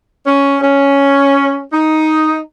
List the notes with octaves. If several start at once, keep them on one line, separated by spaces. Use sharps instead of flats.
C#4
C#4
D#4